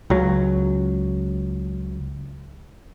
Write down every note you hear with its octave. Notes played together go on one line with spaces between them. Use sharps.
C#2 F#3